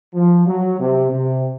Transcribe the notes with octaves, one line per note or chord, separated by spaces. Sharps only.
F3
F#3
C3
C3